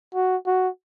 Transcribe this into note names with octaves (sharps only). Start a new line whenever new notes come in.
F#4
F#4